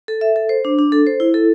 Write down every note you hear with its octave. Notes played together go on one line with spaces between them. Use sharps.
A4
E5
A4
C5
D4
D4
A4
C5
E4
A4